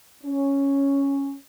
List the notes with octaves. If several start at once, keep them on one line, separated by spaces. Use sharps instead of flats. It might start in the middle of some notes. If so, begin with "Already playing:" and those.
C#4